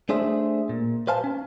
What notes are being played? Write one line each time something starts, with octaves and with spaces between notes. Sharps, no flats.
A3 D4 G#4 C5 E5
A#2
B4 C5 F5 G#5 A5
C#4